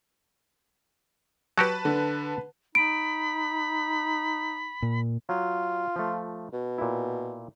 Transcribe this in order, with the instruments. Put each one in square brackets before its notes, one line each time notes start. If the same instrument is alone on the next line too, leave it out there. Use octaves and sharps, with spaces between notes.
[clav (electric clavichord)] F#3 F#4 G4 [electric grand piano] B4 A5
[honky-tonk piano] D3
[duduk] D#4 [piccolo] B5 [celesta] D7
[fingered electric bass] A#2
[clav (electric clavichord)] F#3 [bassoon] F4
[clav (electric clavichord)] F3 A3
[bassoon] B2
[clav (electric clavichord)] A#2 E4